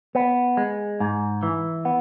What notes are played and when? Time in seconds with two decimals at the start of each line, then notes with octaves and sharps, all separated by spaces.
0.15 B3
0.57 G#3
1.00 G#2
1.43 E3
1.85 B3